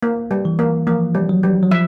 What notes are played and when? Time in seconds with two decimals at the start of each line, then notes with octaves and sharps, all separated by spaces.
0.03 A#3
0.31 G3
0.45 E3
0.59 A#3
0.87 F3 A#3
1.15 G3
1.29 F#3
1.43 G3
1.63 F#3
1.71 F3 E5